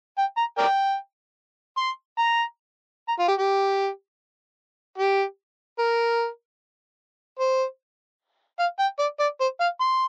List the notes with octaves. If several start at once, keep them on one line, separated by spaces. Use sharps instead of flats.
G5
A#5
A#4 D5 G5
C6
A#5
A#5
F4
G4
G4
G4
A#4
C5
F5
G5
D5
D5
C5
F5
C6